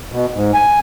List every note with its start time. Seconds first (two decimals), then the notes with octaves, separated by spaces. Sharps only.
0.12 B2
0.34 G#2
0.54 G#5